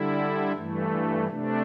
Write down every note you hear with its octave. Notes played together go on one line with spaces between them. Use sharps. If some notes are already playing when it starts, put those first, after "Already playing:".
Already playing: D3 G3 E4
G2 E3 A3
C3 A3 D4